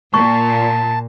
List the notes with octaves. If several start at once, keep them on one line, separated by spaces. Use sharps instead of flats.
A#2 A5 C#6